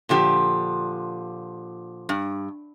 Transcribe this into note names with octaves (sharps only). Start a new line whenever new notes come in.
A#2 D3 F3 G4
G2